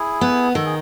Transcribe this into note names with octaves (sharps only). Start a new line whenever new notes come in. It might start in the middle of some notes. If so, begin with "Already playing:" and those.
Already playing: E4 G#4
B3
D#3 A4
G#4